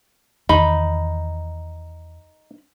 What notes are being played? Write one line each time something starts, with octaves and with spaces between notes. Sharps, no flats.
E2 D#3 D#4 B5